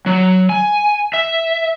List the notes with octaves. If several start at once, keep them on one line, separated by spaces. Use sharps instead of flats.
F#3
G#5
E5